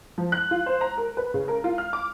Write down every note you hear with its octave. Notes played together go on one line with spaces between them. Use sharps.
F3
F#6
F4
C5
A#5
A#4
B4
C#3
A#4
F4
F6
D6